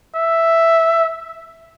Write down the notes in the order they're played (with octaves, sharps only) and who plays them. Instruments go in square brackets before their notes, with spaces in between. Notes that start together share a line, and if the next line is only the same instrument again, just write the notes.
[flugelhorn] E5